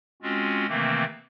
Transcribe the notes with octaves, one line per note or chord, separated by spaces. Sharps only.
G#3 C4 C#4 F4 F#4
C3 D#3 E3 A3 A#3 C4